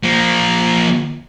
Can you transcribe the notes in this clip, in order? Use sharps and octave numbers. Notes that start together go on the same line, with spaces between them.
F3 A#3